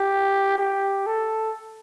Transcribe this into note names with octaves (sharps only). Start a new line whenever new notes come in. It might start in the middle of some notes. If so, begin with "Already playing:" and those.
Already playing: G4
G4
A4